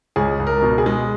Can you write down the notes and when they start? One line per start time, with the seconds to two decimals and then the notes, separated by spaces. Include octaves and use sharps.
0.16 C#2 G#4
0.39 C#2
0.47 A#4
0.63 B2
0.78 G#4
0.86 G#3